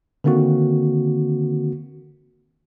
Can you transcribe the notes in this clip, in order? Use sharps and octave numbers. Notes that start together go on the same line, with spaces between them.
D3 D#3 A#3 C4 F#4